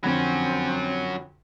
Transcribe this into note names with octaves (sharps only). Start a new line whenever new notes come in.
F2 D3 F#3 C4 C#4 B5